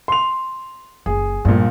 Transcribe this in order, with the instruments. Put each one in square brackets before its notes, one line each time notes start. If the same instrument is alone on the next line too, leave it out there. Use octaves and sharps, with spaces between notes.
[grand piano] C6 F7
[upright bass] F#1 [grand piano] G#4
[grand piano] A#1 A#2 [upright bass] G2